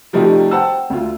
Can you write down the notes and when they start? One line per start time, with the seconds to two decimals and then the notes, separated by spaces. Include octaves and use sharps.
0.13 C3 F3 G3 A3 D#4 F#4
0.51 C5 F#5 G5 A5 E6
0.90 D2 F4